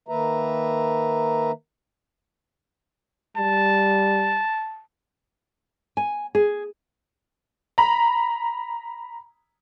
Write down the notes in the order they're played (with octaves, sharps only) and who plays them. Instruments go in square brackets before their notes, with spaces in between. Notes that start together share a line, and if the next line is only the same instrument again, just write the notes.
[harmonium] D#3 A#3 B4 E5 A#5
[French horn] G3 [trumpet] A5
[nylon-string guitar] G#5
G#4
[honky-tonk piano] A#5 B5